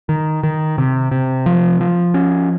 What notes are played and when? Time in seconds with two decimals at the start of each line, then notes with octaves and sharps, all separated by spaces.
0.09 D#3
0.43 D#3
0.78 C3
1.11 C3
1.46 F3
1.81 F3
2.14 C#4